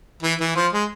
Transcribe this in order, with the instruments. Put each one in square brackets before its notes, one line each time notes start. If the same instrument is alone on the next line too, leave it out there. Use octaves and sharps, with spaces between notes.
[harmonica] E3
E3
F3
G#3